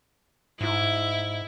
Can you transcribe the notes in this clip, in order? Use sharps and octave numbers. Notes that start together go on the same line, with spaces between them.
G#2 E4